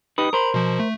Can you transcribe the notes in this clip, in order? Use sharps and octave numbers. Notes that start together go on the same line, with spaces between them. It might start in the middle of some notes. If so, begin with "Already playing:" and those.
D#4 G4 B4 D#6
A#4 C5 A#5 B5
B2 F3
A3